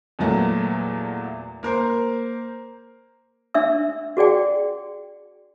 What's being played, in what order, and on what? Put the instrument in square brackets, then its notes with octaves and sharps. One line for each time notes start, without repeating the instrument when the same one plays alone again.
[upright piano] E2 A#2 F#3 A3
A#3 A#4 C5
[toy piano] D4 E5 E6
F#4 G#4 D5 G5